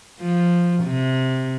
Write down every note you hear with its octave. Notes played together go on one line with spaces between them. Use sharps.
F3
C3